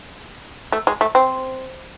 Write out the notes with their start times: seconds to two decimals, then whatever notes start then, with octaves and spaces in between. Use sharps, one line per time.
0.72 A3
0.87 G#3
1.01 A3
1.15 C4